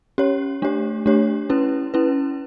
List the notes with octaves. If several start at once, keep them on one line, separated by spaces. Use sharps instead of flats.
C#4 G4 C#5
A3 D4 G4 C#5
A3 D4 G4 C#5
C#4 E4 B4
C#4 E4 B4